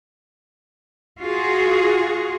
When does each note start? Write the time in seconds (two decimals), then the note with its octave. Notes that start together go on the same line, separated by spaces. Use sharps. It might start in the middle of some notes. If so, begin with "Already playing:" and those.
1.21 F4 F#4 G#4